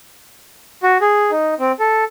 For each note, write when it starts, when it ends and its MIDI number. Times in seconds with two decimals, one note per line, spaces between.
0.83 0.98 66
1.01 1.31 68
1.31 1.54 63
1.59 1.72 60
1.80 2.04 69